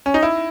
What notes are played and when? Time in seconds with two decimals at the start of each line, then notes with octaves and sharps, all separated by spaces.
0.06 C#4
0.14 D#4
0.23 E4